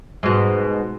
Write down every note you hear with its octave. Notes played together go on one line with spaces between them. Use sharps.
G#2 B2